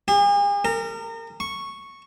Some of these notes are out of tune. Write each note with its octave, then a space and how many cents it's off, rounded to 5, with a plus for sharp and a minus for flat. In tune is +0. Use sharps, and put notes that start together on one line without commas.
G#4 -45
A#4 -30
C#6 -5